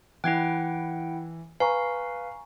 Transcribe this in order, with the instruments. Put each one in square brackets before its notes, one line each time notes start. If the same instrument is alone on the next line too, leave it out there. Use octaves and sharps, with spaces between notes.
[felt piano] E3 [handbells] E4 F#5 G5 [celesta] F#6 G#6 C7
[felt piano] B4 [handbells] F5 [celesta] G#5 A#5 C#6